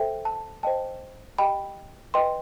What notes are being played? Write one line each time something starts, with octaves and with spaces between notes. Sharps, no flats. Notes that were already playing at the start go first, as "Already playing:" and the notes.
Already playing: A4 C5 E5 G5
A5
C5 D#5 G5 A5
G4 D#5 G5 B5
B4 D#5 G5 C6